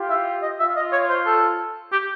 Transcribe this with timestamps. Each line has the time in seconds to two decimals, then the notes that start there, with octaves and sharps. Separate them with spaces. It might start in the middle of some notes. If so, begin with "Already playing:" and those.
Already playing: F4 G4
0.10 E5
0.43 D#5
0.60 F4 E5
0.76 D#5
0.92 C#5
1.09 C5
1.26 A4
1.92 G4